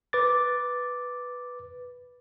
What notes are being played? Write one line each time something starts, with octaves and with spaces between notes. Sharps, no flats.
B4 D6 A6